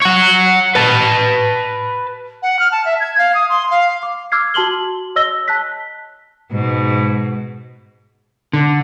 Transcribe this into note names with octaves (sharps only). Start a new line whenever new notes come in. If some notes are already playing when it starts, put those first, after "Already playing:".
C#5 F#5
B4 A5
F#5
F6
A5
E5
G#6
F5
D#6
C6
F5
D6
D6 E6 F6 G#6 C7
F#4 A5 C6 F#7 G7
C#5 D#5 E6 A#6 G7
A5 F#6 B6
G#2 B2
D3